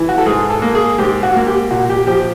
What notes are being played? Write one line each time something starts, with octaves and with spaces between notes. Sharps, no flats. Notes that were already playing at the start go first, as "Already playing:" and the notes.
Already playing: E3
F#4
A4
G#2 G#4
A4
A#3
G#4
G#2 G4
F#4
A#3
G4
A#2 F#4
G4
F3 G4